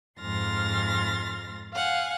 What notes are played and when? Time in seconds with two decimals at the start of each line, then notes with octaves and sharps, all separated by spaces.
0.21 F2 G#2 C6 F6 A6 A#6
1.73 F5 F#5 G#5